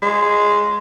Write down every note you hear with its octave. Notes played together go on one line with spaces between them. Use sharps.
G#3